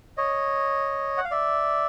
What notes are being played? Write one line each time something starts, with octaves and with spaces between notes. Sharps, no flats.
C#5 D#5
F#5
F5
D5 E5